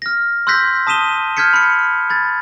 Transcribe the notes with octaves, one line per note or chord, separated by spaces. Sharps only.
F6 A#6
C6 E6 F#6 G6 A#6 B6
A5 D#6 B6 D#7 E7 G7
F6 G6 G#6 B6 C#7
B5 C#7
B5 G#6 A6